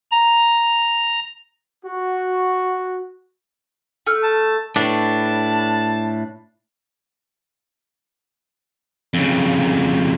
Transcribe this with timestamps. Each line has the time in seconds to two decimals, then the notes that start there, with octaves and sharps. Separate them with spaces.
0.12 A#5
1.85 F#4
4.07 A3 F6
4.23 A5
4.76 A2 D4 B4 C#5 A5
9.14 F2 C#3